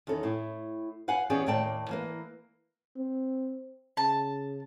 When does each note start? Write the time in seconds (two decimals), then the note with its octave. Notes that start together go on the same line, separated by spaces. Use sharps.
0.07 E2 D#3 C#4 A4
0.23 A2 E4
1.08 B4 F5 F#5 G#5
1.30 E3 B3 C#4 G4 G#4 D5
1.46 D#2 A2 A#3 D5 G5 A5
1.89 E3 A#3 B4
2.97 C4
3.97 C#3 A5